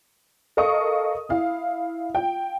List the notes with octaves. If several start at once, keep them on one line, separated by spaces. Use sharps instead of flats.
A4 A#4 D#5 F5 C#6 D#6
E4 F5
F4 G5